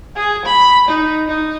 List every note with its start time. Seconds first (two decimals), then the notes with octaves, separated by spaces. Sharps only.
0.16 G#4
0.45 B5
0.88 D#4
1.27 D#4